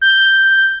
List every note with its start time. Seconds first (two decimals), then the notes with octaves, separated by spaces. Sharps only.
0.01 G6